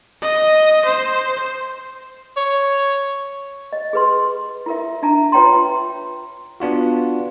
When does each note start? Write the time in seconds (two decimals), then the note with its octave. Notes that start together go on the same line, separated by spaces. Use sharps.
0.22 D#5
0.85 C5
2.37 C#5
3.73 D#5
3.93 G#4 B4 C6
4.66 E4 A#4 E5
5.03 D4 E5 A5 A#5
5.32 F4 B4 C#5 G5 A#5 C6
6.60 B3 D4 F4 F#4